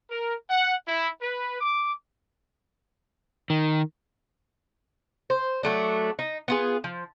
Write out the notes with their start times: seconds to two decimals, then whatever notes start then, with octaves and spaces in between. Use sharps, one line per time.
0.11 A#4
0.50 F#5
0.88 E4
1.21 B4
1.61 D6
3.50 D#3
5.30 C5
5.63 F#3 A3 D4
6.19 D#4
6.48 B3 F4 G#4
6.84 F3